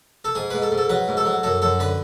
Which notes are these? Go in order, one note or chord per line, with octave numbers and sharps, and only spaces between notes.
A4
G#2 G#4
G#2 B4
A4
G#2
A4
F#3 B4
G#2
A4
F#3
F#2 A4
F#2 A4
D3 B4